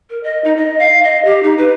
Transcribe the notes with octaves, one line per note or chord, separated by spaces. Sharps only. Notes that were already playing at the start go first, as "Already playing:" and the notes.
A#4
D#5
D#4
D#5
F5
D#5
G4
D#4
B4